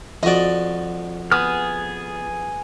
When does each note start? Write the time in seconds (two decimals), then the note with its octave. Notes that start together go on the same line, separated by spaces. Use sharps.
0.23 F2 F#4 D5 D#5
1.32 B3 G#4 D#6 F6